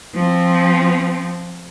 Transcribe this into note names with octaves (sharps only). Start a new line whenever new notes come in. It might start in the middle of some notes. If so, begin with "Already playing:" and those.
F3 C4